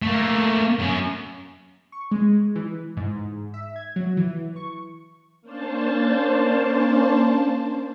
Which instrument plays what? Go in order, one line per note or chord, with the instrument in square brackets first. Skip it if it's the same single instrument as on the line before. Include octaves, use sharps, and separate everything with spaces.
[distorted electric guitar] A3 A#3
F#2
[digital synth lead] C#6
G#3
E3
G#2
E5
G#6
F#3
E3
C#6
[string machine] A#3 C#4 D4 C5 A5